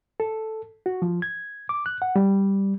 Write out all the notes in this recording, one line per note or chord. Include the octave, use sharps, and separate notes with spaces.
A4
F#4
F3
G#6
D6
F#6
F#5
G3